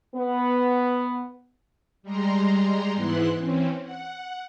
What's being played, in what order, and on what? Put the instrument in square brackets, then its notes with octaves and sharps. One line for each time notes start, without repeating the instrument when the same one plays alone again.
[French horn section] B3
[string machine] G3 G#3 A#5 C6
G#2 E3 B3 E4 C6 F#6
E3 C4 C#4
F#5